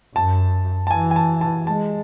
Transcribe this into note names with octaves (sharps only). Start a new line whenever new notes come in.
F#2 A5
A5
E3 G#5
G#5
A5
A5
G#3 A5